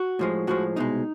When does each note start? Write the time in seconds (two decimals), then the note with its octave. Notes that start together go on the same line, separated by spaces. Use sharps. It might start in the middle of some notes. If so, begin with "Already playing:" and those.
Already playing: F#4
0.19 A2 F3 G#3
0.47 A2 F3 G#3 F#4
0.76 C2 B2 G#3 D#4